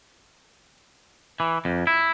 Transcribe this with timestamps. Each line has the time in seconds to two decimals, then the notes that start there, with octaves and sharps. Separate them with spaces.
1.40 E3
1.65 F2
1.87 E4